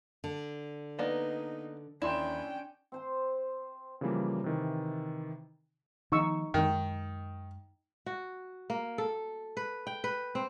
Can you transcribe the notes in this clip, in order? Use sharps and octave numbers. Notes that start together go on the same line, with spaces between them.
D3
A#3 B3 D#4 D5
D#2 C#4 D4 E4 G5 C6 E7
C4 C5 C6
C#3 E3 F3 G3 A#3
C3 D#3 E3
D#3 F3 A#3 D#4 C#6 E6
F#2 D#3 G#3
F#4
A#3
A4
B4
G5
B4
C4